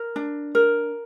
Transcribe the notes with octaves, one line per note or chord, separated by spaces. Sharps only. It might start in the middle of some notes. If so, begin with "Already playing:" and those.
Already playing: A#4
D4
A#4